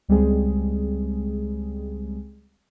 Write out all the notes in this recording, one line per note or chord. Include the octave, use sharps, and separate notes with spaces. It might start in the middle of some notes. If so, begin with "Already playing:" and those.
C#2 G3 G#3 C4 G#4